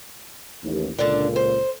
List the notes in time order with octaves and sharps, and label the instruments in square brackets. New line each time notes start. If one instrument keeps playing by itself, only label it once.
[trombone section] A1 D#2
[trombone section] C#2 A#2 [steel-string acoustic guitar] D3 D4
[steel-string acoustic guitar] C5